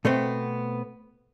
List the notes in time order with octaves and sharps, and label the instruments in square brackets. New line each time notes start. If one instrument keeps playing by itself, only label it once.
[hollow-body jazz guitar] B2 A3 B3 C4